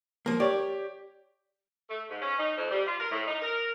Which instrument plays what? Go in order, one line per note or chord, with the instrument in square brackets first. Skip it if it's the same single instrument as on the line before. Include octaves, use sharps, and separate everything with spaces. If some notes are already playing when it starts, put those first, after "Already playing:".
[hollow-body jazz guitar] F3 A#3 [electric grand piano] A#4
[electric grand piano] G4 [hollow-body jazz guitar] C#5 [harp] D5
[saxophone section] A3
G#2
C#4
D#4
F2
G3
F4
A#4
A2
D#4
A#4